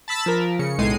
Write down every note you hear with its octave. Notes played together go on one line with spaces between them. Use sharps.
A5 B5 E6 A6 B6
F3 A#4
C#3 C#7
B1 A2 G#3 C7 D#7